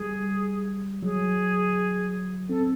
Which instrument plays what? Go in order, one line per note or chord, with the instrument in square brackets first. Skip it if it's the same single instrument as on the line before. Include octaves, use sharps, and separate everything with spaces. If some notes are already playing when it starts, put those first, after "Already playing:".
Already playing: [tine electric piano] G3 [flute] G#4
[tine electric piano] F#3 [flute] G#4
[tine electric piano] C4 [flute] A4